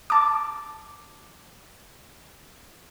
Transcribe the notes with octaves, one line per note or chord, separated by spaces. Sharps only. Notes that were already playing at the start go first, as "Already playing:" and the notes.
A5 D6